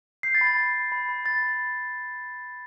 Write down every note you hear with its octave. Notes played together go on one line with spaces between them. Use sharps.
G6 C7
A6
B5
A6
B5
B5
B5
B5
B5 A6
B5